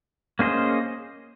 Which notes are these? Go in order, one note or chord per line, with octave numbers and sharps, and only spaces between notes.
A#3 C#4 G#4 C5 D#5